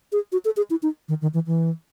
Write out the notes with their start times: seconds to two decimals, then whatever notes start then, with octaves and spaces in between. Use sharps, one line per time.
0.12 G#4
0.32 F#4
0.45 A4
0.57 G#4
0.70 E4
0.83 D#4
1.09 D#3
1.22 D#3
1.34 E3
1.47 E3